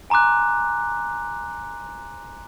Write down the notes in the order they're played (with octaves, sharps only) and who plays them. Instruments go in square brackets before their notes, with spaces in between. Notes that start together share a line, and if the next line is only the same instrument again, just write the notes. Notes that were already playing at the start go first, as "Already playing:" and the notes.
[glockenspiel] G#5 A#5 C6 D6 F#6